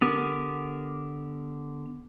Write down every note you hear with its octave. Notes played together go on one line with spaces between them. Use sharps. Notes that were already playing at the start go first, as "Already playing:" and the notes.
D3 B3 G4 A#4